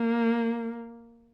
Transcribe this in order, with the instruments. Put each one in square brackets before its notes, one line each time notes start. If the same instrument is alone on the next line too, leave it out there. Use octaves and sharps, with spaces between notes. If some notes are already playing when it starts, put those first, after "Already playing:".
Already playing: [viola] A#3